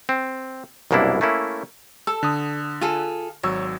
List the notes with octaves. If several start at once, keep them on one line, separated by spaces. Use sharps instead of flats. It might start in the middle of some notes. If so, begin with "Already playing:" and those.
C4
C2 F#2 B2 A#3 D4 E4
A3 A#3 C#4 E4
A4 E6
D3 D#6
F4 G#4 A4
G#1 F#3 C#5 E6